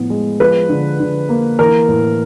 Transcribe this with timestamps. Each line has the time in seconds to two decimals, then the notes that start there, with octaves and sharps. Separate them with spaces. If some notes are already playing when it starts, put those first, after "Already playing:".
Already playing: A2 F3 B3
0.10 G#3
0.40 F3 B4
0.69 D3
1.00 D3
1.29 A#3
1.59 E3 A#4
1.88 A2